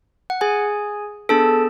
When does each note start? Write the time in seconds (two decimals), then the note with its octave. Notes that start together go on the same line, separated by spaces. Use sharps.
0.30 F#5
0.41 G#4 G#5
1.29 B3 D4 G#4 A4 A5